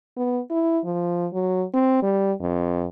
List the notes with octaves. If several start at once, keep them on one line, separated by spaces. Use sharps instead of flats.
B3
E4
F3
F#3
C4
G3
F2